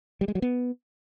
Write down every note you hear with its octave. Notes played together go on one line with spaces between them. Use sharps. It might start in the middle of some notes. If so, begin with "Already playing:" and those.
G3
G#3
F#3
B3